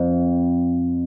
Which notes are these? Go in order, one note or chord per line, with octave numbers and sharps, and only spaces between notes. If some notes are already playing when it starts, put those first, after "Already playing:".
Already playing: F2